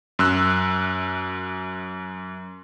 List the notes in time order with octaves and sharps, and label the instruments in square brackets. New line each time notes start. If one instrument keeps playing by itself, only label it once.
[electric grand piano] F#2 E6 F#6